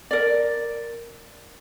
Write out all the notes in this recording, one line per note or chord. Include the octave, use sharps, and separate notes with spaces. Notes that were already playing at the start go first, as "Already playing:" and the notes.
A#4 D5